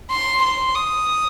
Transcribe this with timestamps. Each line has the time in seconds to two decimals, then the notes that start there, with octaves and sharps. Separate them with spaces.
0.11 C6
0.43 C6
0.75 D#6